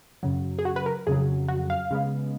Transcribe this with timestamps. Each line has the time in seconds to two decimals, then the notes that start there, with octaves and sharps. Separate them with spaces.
0.23 F#2 C#3 F#3
0.59 G#4
0.65 F#4
0.76 B4
0.86 A#4
1.07 F2 C#3 F#3 G#4
1.48 F#4
1.70 F5
1.91 C#3 G#3 B3